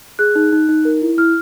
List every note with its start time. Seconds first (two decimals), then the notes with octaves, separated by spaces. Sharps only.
0.19 G#4 F#6
0.35 D#4
0.52 D#4
0.69 D#4
0.85 A#4
1.02 E4
1.18 E4 F6